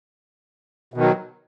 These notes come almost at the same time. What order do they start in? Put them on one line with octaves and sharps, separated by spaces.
B2 D#3 F#3